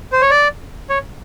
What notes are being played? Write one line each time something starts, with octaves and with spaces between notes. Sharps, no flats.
C5
C#5
D5
C#5